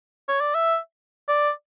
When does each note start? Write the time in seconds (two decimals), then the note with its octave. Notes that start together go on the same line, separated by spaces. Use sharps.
0.29 C#5
0.41 D5
0.54 E5
1.28 D5